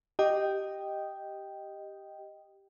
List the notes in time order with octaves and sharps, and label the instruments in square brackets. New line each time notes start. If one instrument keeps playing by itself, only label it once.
[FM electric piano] G4 D#5 G5